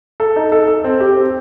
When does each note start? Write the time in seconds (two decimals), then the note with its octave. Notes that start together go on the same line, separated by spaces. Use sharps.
0.20 A4
0.36 D#4
0.52 A4
0.68 A4
0.84 C4
1.00 G4
1.17 C4